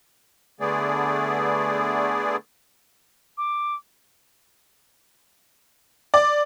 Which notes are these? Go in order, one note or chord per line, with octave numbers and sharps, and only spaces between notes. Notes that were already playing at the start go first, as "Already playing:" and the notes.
D3 A3 B3 G#4 D5
D6
D5